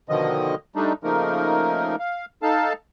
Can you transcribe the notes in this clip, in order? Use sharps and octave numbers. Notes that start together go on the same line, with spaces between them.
B2 D3 D#3 F3 D#5
G3 A3 D4 D#4
C#3 F3 A3 A#3 D#4 A#4
F5
D#4 A4 F5 A5